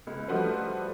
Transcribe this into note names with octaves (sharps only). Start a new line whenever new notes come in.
C#2
F3 G3 A3 F#4 B4 C5